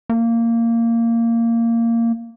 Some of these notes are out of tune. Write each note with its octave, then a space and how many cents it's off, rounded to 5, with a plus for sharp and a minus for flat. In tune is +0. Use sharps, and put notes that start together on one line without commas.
A#3 -15